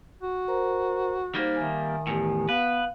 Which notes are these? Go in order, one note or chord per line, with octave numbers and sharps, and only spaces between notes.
F#4
A#4 C5 A#5
G3 A#3 D#4 C5
D#3 E5 G#5
E2 A2 G4 G#5
B3 B4 F5